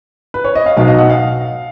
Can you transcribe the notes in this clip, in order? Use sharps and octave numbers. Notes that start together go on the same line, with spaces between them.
B4
C#5
D#5
F5
B1 B2 F#3 F5
D#5
F#5
F5